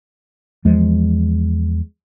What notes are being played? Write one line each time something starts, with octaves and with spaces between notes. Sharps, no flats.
E2 F3 G#3